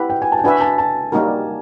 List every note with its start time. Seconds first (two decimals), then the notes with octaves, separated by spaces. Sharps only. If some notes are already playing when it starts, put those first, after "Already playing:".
Already playing: C4 E4 G4 B4 F#5
0.10 G5
0.22 G#5
0.32 A5
0.39 G5
0.44 D4 F#4 B4 E5 G#5
0.61 A5
0.78 A5
1.12 G3 A#3 D#4 F#4 A#4